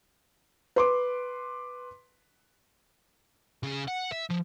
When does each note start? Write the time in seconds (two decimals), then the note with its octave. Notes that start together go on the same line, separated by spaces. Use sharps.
0.76 B4 C6 D6
3.63 C#3 G#4
3.88 F#5
4.12 E5
4.30 F3